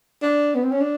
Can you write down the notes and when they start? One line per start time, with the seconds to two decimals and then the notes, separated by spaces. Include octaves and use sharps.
0.23 D4
0.55 B3
0.63 C4
0.72 C#4
0.81 D4